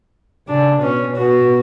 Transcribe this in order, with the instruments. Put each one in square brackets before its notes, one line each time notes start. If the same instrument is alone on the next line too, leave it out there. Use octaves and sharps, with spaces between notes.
[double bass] C#3 [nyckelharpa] D4
[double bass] B2 [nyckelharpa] C#4
[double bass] B2 [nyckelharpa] F#4